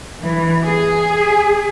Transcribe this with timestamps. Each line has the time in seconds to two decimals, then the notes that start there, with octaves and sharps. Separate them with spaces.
0.21 E3
0.65 G#4